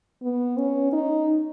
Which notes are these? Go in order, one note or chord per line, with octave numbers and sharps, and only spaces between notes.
B3
C#4
D#4